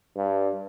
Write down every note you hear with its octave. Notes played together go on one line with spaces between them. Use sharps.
G2